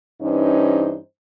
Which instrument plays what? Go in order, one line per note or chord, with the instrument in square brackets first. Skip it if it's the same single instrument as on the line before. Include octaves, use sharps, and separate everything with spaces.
[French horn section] G2 E3 C#4 D#4 C5